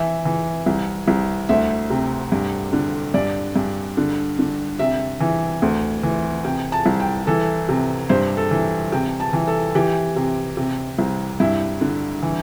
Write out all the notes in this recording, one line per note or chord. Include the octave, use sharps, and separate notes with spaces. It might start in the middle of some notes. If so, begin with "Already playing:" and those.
Already playing: E3 E5
E3
C2
C2
D2 E5
C3
G2
D3
G2 D5
G2
D3
D3
C3 E5
E3
D2
E3
C3 G5
A5
C2
G5
E3 A4
C3
G2 C5
A4
E3
C3 G5
A5
E3
A4
E3 G4
C3
C3
C2
G2 E4
D3
E3